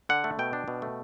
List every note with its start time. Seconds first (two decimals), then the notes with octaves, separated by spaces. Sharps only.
0.09 D3 F#5
0.24 A3
0.39 B2 G5
0.53 D4
0.68 B2
0.82 A3